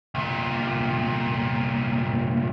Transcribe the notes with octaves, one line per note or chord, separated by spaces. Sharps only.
C2 A#2